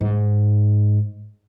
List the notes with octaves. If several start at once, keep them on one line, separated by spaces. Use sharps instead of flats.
G#2